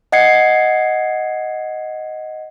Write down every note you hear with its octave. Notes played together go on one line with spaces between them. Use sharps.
D#5 F#5 G#6 C7 C#7